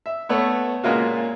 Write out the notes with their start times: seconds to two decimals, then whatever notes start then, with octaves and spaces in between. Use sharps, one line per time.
0.06 E5
0.29 A3 B3 C#5
0.83 A#2 C#3 G#3 A#3 F4 F#4